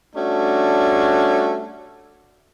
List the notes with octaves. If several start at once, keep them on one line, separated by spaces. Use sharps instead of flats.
G3 A3 C#4 D4 F#4